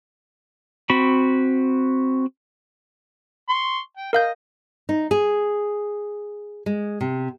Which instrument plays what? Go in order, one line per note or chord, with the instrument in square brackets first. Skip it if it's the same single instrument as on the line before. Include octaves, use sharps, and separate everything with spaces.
[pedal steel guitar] C4 F#4 B5
[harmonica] C6 C#6
G5
[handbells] A#4 F5 G6 [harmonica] D#5
[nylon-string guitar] D#4
G#4
G#3
C3